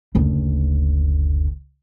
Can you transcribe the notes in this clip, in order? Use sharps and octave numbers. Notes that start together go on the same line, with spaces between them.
F#1 D2